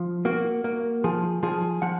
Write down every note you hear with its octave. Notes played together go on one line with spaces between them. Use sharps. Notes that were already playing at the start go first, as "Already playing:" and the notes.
Already playing: F3
A#3 F#4
A#3
F3 G#4
F3 G#4
F3 F#5